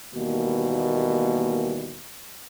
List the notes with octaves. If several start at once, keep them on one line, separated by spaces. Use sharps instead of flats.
D#2 B2 D#3 E3 G3 A#3